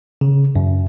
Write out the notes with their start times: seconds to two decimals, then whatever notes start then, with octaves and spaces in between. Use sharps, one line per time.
0.21 C#3
0.56 F#2